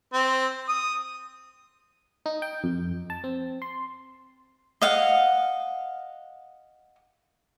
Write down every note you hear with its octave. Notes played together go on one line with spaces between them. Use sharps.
C4
D#6
D#4
G5
F2
A5
C4
C6
D#5 F5 F#5